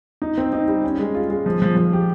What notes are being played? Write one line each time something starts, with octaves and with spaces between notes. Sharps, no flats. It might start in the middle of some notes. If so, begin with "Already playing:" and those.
D#4
C4
D#4
G3
C#4
G#3
F4
G#3
F3
F3
F3
G4